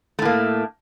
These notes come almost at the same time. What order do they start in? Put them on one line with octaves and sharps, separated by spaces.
A3 A2 A#3